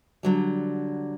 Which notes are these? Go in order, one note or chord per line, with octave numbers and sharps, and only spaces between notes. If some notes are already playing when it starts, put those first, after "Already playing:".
D3 F#3 G3